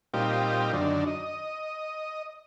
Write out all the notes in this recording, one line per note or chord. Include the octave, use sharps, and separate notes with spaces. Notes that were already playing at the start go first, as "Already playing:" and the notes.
A#2 G3 C4 D#4 F4 G4
F#2 D3 D#3 D4
D#5